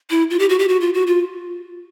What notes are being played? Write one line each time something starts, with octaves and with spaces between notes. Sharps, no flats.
E4
F4
G4
F#4
G4
F#4
F4
F#4
F4